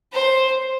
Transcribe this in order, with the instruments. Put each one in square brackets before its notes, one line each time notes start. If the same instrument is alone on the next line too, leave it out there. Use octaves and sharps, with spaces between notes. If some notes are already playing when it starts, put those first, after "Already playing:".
[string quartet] C5